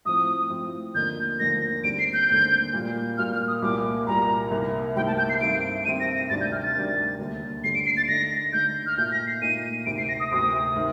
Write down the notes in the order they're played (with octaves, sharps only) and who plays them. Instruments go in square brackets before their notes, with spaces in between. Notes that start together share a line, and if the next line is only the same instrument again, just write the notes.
[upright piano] A2 F3 C4 [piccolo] D#6
[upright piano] A2 F3 C4
[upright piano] D#2 D3 F3 A#3 D#4 [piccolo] G6
[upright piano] D#2 D3 F3 A#3 D#4 [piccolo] A#6
[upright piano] D#2 D3 G3 C4 [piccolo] D7
[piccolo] C7
G6
[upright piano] D#2 D3 G3 C4
A#2 G3 A#3 F4
[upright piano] A#2 G3 A#3 F4 [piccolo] F6
[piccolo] F6
D#6
[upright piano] C2 A#2 G3 A#3 [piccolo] D6
[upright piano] C2 A#2 G3 A#3 [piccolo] A#5
[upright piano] C2 C3 D#3 A#3
[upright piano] C2 C3 D#3 A#3 [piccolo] G5
[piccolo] A5
G6
C7
[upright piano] G2 D#3 A3 C4 [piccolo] D7
[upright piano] G2 D#3 A3 C4 [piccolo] D#7
[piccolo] A#6
A#6
[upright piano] D2 C3 D#3 G3 D4 [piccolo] A6
[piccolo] G6
F6
A6
[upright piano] D2 C3 D#3 G3 D4
D#2 D3 G3
[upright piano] D#2 D3 G3 [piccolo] C7
[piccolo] D7
C7
A6
[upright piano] D3 A3 D#4 [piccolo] A#6
[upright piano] D3 A3 D#4 [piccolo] G6
[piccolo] F6
[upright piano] A#2 A3 D#4 [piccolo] G6
[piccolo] A#6
C7
[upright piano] A#2 A3 D#4 [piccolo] D#7
[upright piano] D2 C3 D#3 [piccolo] D7
[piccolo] C7
A#6
D#6
[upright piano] D2 C3 D#3 [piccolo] D#6
[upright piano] C3 D#3